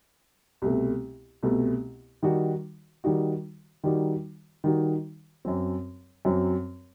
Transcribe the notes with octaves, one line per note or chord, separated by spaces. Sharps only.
C2 B2 A3
C2 B2 A3
D#3 G3 D#4 F#4
D#3 G3 D#4 F#4
D#3 G3 D#4 F#4
D#3 G3 D#4 F#4
F#2 F#3 C4
F#2 F#3 C4